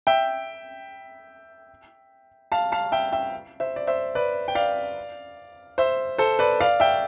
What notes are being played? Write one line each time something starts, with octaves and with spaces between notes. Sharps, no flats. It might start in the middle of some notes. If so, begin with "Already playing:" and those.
E5 G5
F5 A5
F5 A5
E5 G5
E5 G5
C5 E5
D5
C5 E5
B4 D5
G5
D5 F5
C5 E5
A4 C5
B4 D5
D5 F5
E5 G5